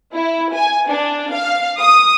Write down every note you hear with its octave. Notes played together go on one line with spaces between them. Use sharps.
E4
G#5
D4
F5
D#6